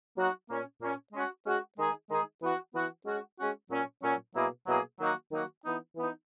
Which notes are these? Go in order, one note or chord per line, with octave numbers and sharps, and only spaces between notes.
F#3 A#3 D#4 F#4
A#2 A#3 C#4
A#2 A#3 C#4
G#3 C#4 F#4
G#3 C#4 F#4
D#3 G#3 D#4 G#4
D#3 G#3 D#4 G#4
E3 B3 F#4
E3 B3 F#4
G#3 C#4 F#4
G#3 C#4 F#4
A#2 F#3 C#4
A#2 F#3 C#4
B2 F#3 A#3 E4 G#4
B2 F#3 A#3 E4 G#4
D#3 F#3 A#3 D#4 F#4
D#3 F#3 A#3 D#4 F#4
E3 B3 D#4
E3 B3 D#4